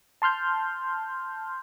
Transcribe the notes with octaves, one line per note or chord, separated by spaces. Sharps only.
A5 C6 F6 G6